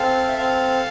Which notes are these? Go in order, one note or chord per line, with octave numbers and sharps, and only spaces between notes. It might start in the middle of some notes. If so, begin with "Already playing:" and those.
Already playing: C4 A4 F5
E5
C4 F5